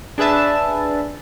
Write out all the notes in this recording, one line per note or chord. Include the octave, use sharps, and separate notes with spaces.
D4 G#4 B4 E5 A5